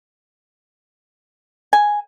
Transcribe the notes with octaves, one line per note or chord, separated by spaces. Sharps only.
G#5